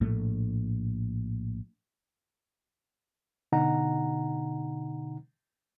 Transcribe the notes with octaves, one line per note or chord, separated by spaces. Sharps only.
A#1 A2 A3
B2 D3 D#4 F#5 A#5